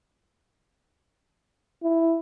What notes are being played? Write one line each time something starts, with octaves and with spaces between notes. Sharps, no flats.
E4